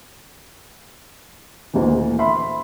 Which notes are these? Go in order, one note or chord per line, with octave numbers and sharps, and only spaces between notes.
D2 A#2 D#3 E3
E5 B5 C6